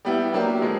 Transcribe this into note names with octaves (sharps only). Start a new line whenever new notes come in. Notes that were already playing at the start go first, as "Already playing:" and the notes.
G3 B3 E4 G4
F#3 A#3 D4 G4
F3 G#3